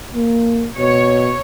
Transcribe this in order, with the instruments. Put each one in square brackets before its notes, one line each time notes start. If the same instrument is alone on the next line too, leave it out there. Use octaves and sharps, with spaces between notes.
[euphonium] A#3
[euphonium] B2 [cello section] C#5